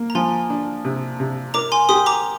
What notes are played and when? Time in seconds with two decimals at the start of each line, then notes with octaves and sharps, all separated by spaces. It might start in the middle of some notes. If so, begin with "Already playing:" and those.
Already playing: A#3
0.10 A#5
0.15 F3 G#5 C6
0.50 D4
0.85 C3
1.20 C3
1.54 A#4 A#5 D6
1.72 G#5 C6
1.89 G4 C6 D#6
2.06 A#5 D6